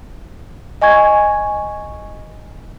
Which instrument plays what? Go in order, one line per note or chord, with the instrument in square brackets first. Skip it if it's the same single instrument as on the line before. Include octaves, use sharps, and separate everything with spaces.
[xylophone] D#5 G#5 C#6 G#6